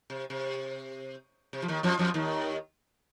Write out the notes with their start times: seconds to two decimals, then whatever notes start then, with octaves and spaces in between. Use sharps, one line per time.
0.10 C3
0.30 C3
1.53 C3
1.62 F3
1.68 D#2 D#3
1.83 F2 F3
1.99 F2 F3
2.14 D#2 D#3